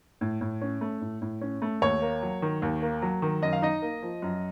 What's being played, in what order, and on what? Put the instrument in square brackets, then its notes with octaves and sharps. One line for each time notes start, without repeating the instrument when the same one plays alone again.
[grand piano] A2
A2
C#4
A3
A2
A2
C#4
A3
D#2 C#5
A#3
F#3
D#3
D#2
A#3
F#3
D#3
F#2 D#5
F5
D#4 D#5
A#3
F3
F#2